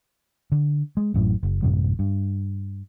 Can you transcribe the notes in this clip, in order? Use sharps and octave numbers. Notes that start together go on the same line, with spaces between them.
D3
G#3
A1 F#2 A2
F#1
A1 F#2 C3 G3
G2